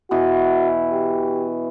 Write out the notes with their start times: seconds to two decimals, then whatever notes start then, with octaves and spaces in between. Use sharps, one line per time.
0.11 B2 E3 F#4
0.92 G4